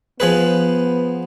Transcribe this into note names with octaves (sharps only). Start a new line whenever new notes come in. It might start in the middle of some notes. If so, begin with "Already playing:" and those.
F3 B3 G#4 B4